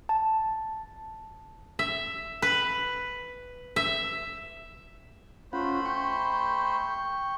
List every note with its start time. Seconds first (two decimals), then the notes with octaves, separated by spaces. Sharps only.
0.09 A5
1.79 E5
2.42 B4
3.76 E5
5.53 A3 C#4 F4 C5 F#5 B5
5.85 G5 C#6